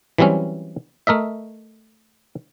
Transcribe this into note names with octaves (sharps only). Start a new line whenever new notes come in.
E3 F#3 G3 C4 C#4
A3 A#4 D#5 E5